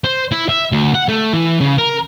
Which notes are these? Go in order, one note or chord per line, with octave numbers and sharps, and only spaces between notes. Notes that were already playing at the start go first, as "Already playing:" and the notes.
C5
E4
E5
D2
F#5
A3
E3
C#3
A#4